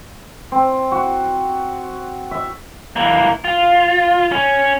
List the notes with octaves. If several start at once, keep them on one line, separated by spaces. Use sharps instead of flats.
C4
F#4
E5
E3 A#3
F4
C#4